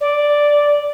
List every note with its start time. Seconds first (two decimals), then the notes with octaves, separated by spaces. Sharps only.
0.01 D5